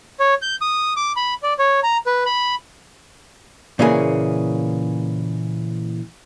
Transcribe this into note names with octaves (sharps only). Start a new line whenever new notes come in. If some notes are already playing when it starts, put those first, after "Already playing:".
C#5
G6
D#6
D6
B5
D5
C#5
A#5
B4
B5
A#2 C#3 E3 A#3 C#4 G#4